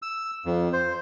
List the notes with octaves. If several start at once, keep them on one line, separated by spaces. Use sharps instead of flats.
E6
F2
C5